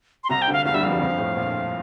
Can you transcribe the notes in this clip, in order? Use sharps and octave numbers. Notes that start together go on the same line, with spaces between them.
C6
C2 C3 A#5
G5
D2 D3 F5
E2 E3 F5
G2 G3 E5
F2 F3 F5
G2 G3
F2 F3
G2
A2
A#1 A#2